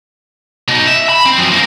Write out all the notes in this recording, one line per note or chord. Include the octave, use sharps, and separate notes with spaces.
B2 D#4
E5
B5
C4
F#2 F3
A#3 C4